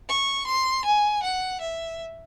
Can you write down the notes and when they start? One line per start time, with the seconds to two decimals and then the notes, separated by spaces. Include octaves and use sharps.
0.09 C#6
0.47 C6
0.85 G#5
1.23 F#5
1.61 E5